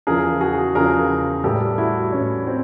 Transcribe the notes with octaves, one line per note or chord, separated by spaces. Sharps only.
E2 C#3 F3 G#4 A#4
F#4 G#4
E2 C#3 F3 G#4 A#4
A2 E3 G3 G4 A4
E4 F#4
A2 E3 G3 C#4
C4